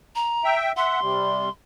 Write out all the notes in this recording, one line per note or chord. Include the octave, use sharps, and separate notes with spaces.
A#5
E5 G5
E5 F#5 C6
C3 G3